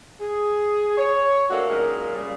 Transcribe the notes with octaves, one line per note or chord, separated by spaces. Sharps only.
G#4
C#5
A3 A#3 C4 D4 F#4 A4
F#2 A#2 G#3 D#4 A#4
F#2 A#2 C#3 G3